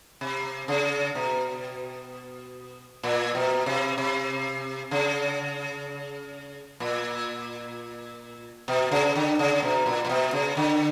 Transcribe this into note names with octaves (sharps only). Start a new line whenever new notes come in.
C3
C#3
B2
A#2
B2
C3
C3
C#3
A#2
B2
C#3
D3
C#3
B2
A#2
A#2
B2
C#3
D3